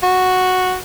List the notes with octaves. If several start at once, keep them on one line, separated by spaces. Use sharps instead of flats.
F#4